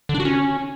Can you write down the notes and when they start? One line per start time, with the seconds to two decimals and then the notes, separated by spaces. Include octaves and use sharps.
0.09 D3
0.14 D4
0.20 F#4
0.25 C#4